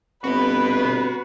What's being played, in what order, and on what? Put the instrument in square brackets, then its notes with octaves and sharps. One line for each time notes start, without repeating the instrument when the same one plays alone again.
[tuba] G1 [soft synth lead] C4 [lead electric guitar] F#4 B5 [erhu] B4